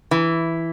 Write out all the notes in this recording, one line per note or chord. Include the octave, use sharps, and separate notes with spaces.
E3